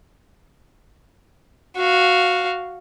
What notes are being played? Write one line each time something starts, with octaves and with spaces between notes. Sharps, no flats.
F#4 F5